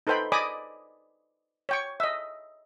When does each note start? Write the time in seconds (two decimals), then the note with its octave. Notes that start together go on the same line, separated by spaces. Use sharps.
0.07 D#4 A4 B4 C5 G5 B5
0.32 D5 D#5 G#5 B5 D6 D#6
1.69 C#5 G5 C#6
2.00 D#5 E5